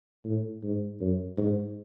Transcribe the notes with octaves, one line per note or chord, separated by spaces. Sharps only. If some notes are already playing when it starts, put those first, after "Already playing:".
A2
G#2
F#2
G#2